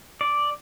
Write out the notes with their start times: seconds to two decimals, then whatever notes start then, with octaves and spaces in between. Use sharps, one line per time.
0.21 D5